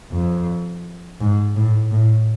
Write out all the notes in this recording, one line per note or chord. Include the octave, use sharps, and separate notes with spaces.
F2
G#2
A2
A2